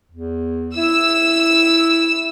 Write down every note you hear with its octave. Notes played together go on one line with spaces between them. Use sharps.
E2
E4 E6